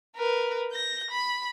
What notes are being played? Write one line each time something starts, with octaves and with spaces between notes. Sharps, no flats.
A#4 B4
G6 A#6
B5